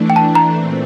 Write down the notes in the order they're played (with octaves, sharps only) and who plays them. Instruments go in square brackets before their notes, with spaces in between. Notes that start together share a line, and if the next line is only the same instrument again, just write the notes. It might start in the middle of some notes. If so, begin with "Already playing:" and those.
Already playing: [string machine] E3 A3 D4
[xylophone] G5
A5
A#5
[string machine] A#2 A3 C4